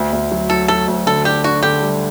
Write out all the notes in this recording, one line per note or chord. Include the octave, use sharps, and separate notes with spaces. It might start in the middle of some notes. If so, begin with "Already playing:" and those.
Already playing: D2
D2
F#3
F#3 A4
F#3 A4
D2
D3 A4
D4 G4
D4 F#4
D3 G4
G3